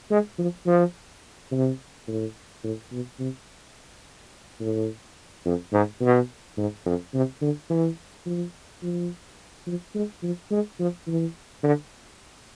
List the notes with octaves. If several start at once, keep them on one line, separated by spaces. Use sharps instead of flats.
G#3
F3
F3
C3
A2
A2
B2
C3
A2
F2
G#2
B2
G#2
F2
C3
D3
E3
F3
F3
F3
G#3
F3
G#3
F3
E3
D3